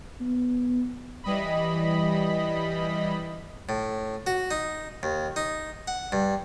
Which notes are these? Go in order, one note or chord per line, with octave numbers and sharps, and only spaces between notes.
B3
E3 G3 D#5 B5
A2
F#4
D#4
D#2
D#4
F#5
G2